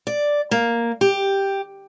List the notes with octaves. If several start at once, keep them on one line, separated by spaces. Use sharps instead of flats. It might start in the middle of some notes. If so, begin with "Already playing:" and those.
D5
A#3
G4